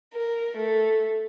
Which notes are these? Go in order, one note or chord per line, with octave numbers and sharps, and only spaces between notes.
A#4
A3